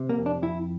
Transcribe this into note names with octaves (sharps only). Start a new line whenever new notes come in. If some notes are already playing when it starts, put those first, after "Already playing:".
Already playing: C3
A#3
F2
D4
F2 E4